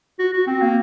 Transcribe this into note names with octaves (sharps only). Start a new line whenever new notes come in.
F#4
F#4
C4
A#3